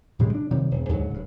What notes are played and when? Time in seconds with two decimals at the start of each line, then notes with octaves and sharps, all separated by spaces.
0.19 A2 C#3 G3 G#3
0.34 D4
0.51 C3 D#3 F#3 G3
0.71 E1 G2
0.89 D2 G#2 C#3 F#3
1.10 D1 G2